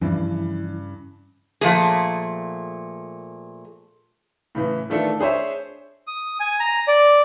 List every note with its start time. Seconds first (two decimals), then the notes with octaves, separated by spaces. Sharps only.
0.01 G2 C#3 E3 F3 E4
1.61 A#2 F3 A3 G#4
4.55 A2 C#3 E3
4.90 D#3 E3 A3 D4 F4 A4
5.19 D4 G#4 C5 C#5 E5
6.07 D#6
6.40 G#5
6.60 A#5
6.88 D5